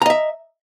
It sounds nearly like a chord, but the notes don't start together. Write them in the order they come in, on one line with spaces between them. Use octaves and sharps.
A#5 D#5 E5